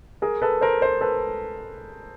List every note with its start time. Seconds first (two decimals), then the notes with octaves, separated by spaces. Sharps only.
0.22 G#4 A#4
0.42 A4 B4
0.61 A#4 C5
0.82 A#4 C5
1.01 A4 B4